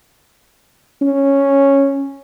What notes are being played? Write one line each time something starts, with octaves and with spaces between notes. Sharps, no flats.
C#4